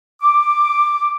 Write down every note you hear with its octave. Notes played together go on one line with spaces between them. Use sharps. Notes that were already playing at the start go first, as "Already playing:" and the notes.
D6